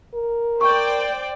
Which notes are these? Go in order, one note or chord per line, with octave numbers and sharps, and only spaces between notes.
A#4
C5 D5 G5 C#6